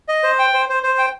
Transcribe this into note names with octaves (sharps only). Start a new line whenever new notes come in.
D#5
C5
G5
C5
C5
C5
G5